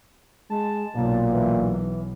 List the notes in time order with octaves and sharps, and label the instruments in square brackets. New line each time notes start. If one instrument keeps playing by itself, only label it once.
[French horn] G#3 [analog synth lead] A5
[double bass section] B1 [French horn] A#2
[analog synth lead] E3